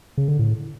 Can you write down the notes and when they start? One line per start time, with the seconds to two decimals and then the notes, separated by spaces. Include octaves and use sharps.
0.18 C#3
0.28 D3
0.39 A2